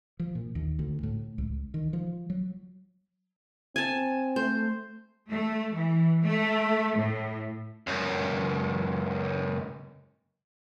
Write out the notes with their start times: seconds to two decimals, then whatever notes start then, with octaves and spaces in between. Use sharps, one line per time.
0.19 F3
0.35 A#2
0.55 D#2
0.79 D2
1.03 A2
1.38 C#2
1.74 D#3
1.93 F3
2.30 F#3
3.76 C4 G#5 A5
4.36 A3 C5
5.29 A3
5.73 E3
6.22 A3
6.98 A2
7.87 C#2 F#2